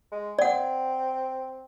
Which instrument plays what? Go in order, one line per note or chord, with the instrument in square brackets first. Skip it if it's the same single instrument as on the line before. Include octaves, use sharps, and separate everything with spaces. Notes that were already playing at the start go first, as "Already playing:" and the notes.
[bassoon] G#3
[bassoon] C4 [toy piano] D5 F#5